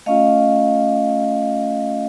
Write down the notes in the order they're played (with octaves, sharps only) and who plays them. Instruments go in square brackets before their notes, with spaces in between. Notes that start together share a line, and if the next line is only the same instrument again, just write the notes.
[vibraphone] A3 C#4 F4 D#5 F5